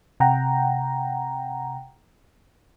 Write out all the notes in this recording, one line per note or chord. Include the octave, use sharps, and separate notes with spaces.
C3 F#5 G5 A#5